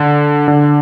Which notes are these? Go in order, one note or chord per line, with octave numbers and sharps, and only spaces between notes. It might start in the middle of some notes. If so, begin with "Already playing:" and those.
Already playing: D3
D3